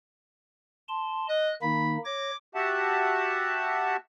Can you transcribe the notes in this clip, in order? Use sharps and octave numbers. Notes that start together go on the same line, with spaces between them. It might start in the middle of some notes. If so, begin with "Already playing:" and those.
A5 C6
D#5 F#6
D#3 A#3 D#4 B5
C#5 D6 A#6
F#4 G4 E5 F#5 A5